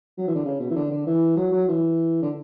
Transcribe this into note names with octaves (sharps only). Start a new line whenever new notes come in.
F#3
E3
D3
C#3
B2
E3
D3
D3
E3
F#3
F#3
E3
D3